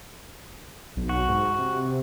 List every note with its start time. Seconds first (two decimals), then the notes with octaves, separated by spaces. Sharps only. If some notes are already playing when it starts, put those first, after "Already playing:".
0.97 B1
1.09 F#4
1.28 G#2
1.59 C3